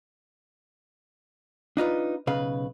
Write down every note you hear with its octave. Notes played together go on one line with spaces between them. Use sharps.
D4 D#4 F4 B4
B1 C#3 B4 F5